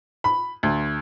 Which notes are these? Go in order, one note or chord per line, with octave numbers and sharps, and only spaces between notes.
B5
D2